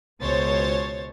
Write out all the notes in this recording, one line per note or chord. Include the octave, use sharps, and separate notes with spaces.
C#2 B2 C5 C#5 A6